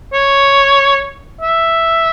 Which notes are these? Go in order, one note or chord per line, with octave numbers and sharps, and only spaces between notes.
C#5
E5